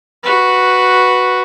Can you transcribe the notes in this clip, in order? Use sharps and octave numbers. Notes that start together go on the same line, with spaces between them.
F#4 B4